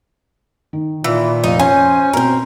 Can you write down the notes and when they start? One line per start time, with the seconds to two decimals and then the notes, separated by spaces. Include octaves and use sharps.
0.73 D#3
1.04 A#2 E3
1.44 F1 D#4 F5
1.59 C#4 C5 C#5 G#5
2.13 B2 C4 A#4 C5